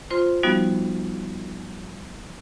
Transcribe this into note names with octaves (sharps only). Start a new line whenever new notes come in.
F4 C5 C6
F3 G3 B3 D#4 F#4